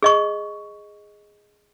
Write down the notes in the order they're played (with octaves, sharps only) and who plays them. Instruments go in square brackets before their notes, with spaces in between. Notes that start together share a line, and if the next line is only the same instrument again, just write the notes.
[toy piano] G#4 D#5 C#6